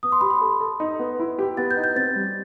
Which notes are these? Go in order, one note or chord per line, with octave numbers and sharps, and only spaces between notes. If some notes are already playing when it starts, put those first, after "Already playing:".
B3 D#6
C6
G4 B5
C6
A4
A4
D#4
B3
E4
G4
B3 A6
G6
D#4
G6
C4 A6
G3